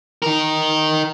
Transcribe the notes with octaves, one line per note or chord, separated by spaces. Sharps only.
D#4 A#4